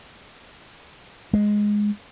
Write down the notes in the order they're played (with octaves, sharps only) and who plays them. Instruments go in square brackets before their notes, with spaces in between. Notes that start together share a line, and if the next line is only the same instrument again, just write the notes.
[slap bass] G#3